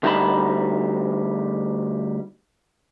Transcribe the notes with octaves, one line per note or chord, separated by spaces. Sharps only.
D2 G3 D#4 F#5 A5 B5